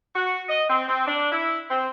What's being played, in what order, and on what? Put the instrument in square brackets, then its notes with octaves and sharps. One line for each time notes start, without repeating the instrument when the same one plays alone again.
[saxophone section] F#4
D#5
C4
C4
D4
E4
C4